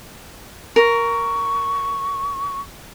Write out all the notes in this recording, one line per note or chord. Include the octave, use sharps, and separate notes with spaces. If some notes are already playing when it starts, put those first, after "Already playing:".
A#4 C#6